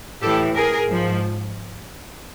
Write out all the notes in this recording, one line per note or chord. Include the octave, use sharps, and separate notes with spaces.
A2 E3 G4 A4
G#4 A#4
G#2 F3